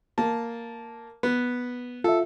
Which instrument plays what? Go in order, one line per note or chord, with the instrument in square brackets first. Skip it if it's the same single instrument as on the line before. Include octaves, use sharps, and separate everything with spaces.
[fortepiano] A#3 A5
B3
[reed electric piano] F4 E5 [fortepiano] A4